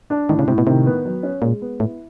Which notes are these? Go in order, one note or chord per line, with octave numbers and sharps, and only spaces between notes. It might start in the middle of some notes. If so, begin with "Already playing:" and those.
D4
A2 D#3
C#3
A2 C3
B2
C3 D#3
B3
F#3
C#4
A#2 G#3
B3
A2 E4